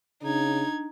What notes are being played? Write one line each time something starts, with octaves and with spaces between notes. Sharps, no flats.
C#3 D4 D#4 G#6